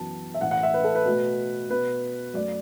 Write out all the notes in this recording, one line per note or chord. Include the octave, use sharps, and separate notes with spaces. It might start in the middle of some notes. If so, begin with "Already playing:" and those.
Already playing: F#2 E3 B3 A5
E5
A2 E3 A3 F#5
F#5
E5
B4
A4
B4
B2 A3
B2 B3 B4
F#2 F#3 A3 D5